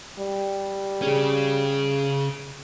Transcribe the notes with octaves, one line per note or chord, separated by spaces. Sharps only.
G3
C#3 C#4 G#4